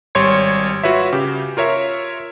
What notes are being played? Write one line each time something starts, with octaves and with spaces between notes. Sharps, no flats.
G#1 G3 C#5 C6 G#6 C#7
F4 F#4 B4 C#5 E5
C#3 G4
F4 A#4 C#5 E5